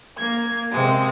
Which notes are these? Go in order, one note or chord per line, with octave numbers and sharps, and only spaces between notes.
A#3 G#6
C3 G#3 A#3